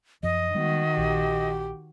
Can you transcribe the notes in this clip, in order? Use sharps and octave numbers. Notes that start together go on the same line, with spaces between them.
F#2 F3 D#5
D#3 G3 G#3 B3 F#4
A#1 G4